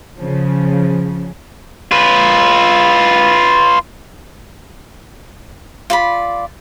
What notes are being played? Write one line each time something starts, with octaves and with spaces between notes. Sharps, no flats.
C#3 F3
F4 B4
F4 D5 B5